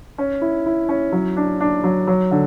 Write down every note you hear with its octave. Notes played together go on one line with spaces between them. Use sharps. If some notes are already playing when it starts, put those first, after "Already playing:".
C#4
E4
E4
C#4
F#3
D4
D4
F#3
F#3
D3